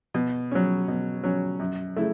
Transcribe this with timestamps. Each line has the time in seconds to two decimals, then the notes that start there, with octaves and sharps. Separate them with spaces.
0.14 B2
0.52 F#3 C#4
0.88 B2
1.23 F#3 C#4
1.60 F#2
1.96 C#3 A3 E4